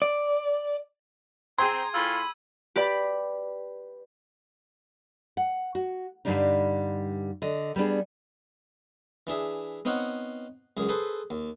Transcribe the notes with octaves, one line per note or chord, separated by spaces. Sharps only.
D5
C4 G#4 G5 A#5 C6 G#6 D#7
A2 F4 B5 E6
G4 B4 D5 B5
F#5
F#4
G2 B2 D3 G3 D4 D#4
D3 D#5
G3 B3 D4 G#4
E3 D4 G#4 E5
B3 C4 D#4 C#5 F5 F#5
C#2 F#2 G#4
G#4 A4 B4 C5
D#2